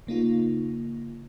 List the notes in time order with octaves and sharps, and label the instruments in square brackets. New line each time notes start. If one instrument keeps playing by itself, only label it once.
[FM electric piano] C#3 A#3 D#4 F4